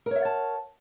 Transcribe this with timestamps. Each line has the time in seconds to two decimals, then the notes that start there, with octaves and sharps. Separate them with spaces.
0.06 A#4
0.11 C#5
0.16 E5
0.20 F#5
0.25 A5